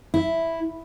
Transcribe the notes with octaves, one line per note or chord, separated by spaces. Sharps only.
E4